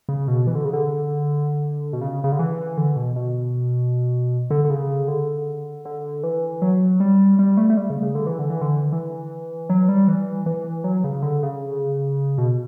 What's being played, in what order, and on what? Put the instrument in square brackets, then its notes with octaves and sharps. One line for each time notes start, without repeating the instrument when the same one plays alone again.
[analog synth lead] C#3
B2
E3
D3
C#3
D3
B2
C#3
C#3
D3
E3
D3
B2
B2
D3
D3
C#3
D3
D3
E3
F#3
G3
G3
A3
A3
G3
C#3
C#3
D3
E3
D3
E3
D3
E3
F#3
G3
E3
E3
F#3
C#3
D3
C#3
B2